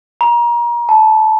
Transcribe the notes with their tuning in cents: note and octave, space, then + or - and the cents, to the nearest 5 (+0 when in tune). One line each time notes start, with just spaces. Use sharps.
A#5 +30
A5 -15